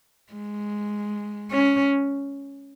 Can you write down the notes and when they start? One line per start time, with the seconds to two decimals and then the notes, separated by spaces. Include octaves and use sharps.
0.33 G#3
1.51 C#4